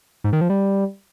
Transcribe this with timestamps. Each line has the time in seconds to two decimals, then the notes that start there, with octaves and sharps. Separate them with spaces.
0.24 G#2
0.33 D#3
0.41 F3
0.50 G3